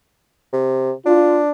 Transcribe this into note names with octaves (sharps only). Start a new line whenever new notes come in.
C3
D4 F4